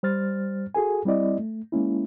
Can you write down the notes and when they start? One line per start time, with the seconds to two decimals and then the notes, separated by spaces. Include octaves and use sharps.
0.03 G3 C5 F6 A6
0.75 F#4 G#4 A4 G#5
1.05 G3 C4 E4 D5 D#5
1.38 A3
1.72 G#3 A#3 C#4 E4